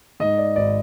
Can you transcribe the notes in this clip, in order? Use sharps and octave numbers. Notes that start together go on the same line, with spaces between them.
G#2 D#5
D5
G#1 D5